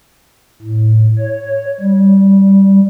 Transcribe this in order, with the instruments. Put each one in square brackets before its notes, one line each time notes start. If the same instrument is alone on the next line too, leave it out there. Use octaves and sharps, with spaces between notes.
[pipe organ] A2
C#5
G3